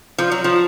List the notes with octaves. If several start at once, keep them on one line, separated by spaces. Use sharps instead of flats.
F3
F#3
F3